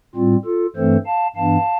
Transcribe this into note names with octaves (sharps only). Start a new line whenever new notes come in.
A2 G3 C4 F4
F4 A4
G2 E3 A3 C4 A4 C5
F5 A5
G2 E3 B3 D4 F5 A5